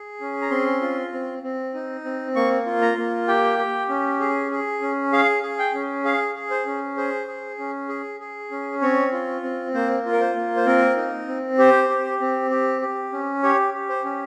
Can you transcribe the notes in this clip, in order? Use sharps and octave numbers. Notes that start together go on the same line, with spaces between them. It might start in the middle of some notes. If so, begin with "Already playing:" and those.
Already playing: G#4
C#4
A#5
C4 C6
F4
C4
C4
D#4
C4
A#3 C#6
F4
A#5
A#3
G4 G5
G4
C#4
G#4
G#4
C#4
G#4 F5
G#4
G5
C#4
G#4 F5
G#4
C5
C#4
G#4 C5
G#4
C#4
G#4
G#4
C#4
C4 C#5
F4
C4
A#3 C5
F4
A#4
C5
A#3
C5
C4 A#4
D#4
C4
G4 C5
G4
C4
G4
G4
C#4
G4 C#5
G4
C5
C#4